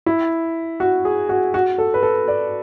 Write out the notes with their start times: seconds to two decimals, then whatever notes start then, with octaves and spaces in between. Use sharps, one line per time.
0.06 E4
0.80 F#4
1.05 G#4
1.29 F#4
1.54 F#4
1.78 A4
1.94 B4
2.03 A4
2.28 D5